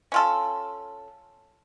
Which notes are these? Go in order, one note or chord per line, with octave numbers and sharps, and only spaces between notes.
C#4 F4 A4